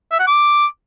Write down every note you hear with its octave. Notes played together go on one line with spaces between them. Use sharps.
E5
F#5
D6